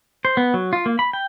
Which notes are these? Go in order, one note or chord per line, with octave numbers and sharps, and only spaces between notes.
C5
B3
F#3
F4
A#3
B5
G5